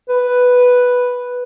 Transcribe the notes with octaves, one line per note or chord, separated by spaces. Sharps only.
B4